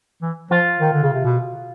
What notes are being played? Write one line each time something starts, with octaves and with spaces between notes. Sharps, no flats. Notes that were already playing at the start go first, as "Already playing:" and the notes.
E3
F3 F4
D#3
D3
C#3
C3
B2